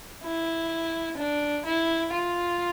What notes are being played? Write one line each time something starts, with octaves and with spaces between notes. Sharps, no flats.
E4
D4
E4
F4